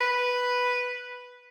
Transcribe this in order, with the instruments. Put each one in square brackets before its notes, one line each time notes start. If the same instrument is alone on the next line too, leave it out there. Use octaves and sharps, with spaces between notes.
[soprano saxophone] B4